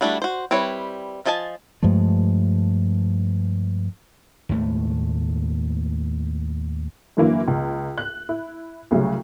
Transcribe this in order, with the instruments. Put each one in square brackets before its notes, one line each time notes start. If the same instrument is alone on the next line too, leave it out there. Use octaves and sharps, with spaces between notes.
[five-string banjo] G3 A3 D4 E4 F#4
F#4 C5
G3 C4 E4 B4 C#5
F3 F4 D#5 G#5 A5
[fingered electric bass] G2 F3 G#3 A3
[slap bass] D#2 A2 G#3 A3
[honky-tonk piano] F#2 D3 E3 F#3 A#3 E4
C#2
F#6
E4
C2 C#3 F#3 G3 A3